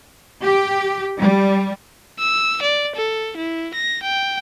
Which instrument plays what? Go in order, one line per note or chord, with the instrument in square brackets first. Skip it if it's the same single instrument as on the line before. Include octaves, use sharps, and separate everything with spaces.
[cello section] G4
G3
[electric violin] E6
D5
A4
E4
A#6
G5